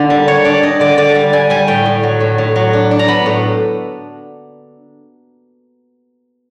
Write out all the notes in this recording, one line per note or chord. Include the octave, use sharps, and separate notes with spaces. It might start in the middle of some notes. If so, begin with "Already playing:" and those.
Already playing: D3 A#3 D4
G3
G3 C#5
D4 D5
D4 D#5
D3 D5
D3 D5
G3
G3 G#5
G3 G#5
A2 G5
A2
F#3
A2
A2
F#3
D4
D4
A#5
B3 B5
A2